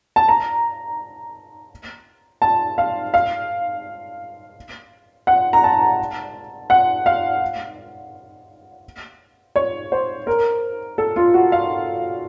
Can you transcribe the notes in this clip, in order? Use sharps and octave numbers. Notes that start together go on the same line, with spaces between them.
A5
A#5
A5
F5
F5
F#5
A#5
A5
F#5
F5
C#5
C5
A#4
A4
F4
F#4
F5